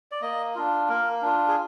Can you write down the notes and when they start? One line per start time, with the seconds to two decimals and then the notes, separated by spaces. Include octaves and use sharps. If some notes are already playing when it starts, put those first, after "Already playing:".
0.12 D5
0.22 A#3 D#5
0.55 D4 F4
0.89 A#3 A#4
1.22 D4 F4
1.48 G#4